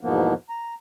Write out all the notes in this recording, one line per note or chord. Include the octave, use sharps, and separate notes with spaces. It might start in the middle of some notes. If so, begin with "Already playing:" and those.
E2 G#2 B2 F3 A#3 B3
A#5